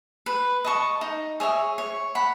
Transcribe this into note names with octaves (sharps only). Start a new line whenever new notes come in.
B4
D#5 A5 C#6
D#4
G#4 C#5 E5
C#5
F#5 B5